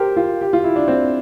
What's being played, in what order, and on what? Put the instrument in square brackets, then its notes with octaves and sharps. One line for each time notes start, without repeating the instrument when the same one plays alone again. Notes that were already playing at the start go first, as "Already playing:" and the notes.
Already playing: [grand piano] G4 A#4 C5
F4
G4
F4
E4
D4
C4